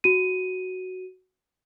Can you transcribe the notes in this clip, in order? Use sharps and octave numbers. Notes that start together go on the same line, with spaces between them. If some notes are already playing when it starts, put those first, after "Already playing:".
F#4 D#7